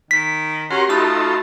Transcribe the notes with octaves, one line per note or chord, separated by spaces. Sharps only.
D#3 B6
C#4 F#4 G4 A#4 C6
A3 D#4 F4 F#4 A4 B5 D#6